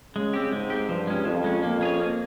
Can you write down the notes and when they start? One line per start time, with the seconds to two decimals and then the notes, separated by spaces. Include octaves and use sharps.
0.15 C#3 G#3
0.33 C4 G4
0.53 G#2 G#3
0.70 C4 G4
0.89 G2 F3
1.07 G#3 C#4
1.25 F2 F3
1.44 G#3 C#4
1.63 F2 A#3
1.81 C#4 G#4 C#5
1.99 A#3